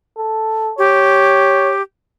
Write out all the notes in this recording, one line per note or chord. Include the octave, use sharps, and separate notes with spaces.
A4
G4 C#5